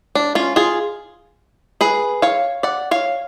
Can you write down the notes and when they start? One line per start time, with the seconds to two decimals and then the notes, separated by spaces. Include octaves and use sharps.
0.15 D4
0.35 C#4 F4
0.56 F4 G#4
1.81 G#4 B4
2.22 C#5 F5
2.63 D5 F#5
2.91 C#5 F5